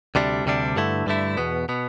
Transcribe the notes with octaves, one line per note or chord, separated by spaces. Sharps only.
D2 C3 G3 D4
D2 C3 G3 D4
G2 D3 A3 E4
G2 D3 A3 E4
E2 B2 B3
B2 B3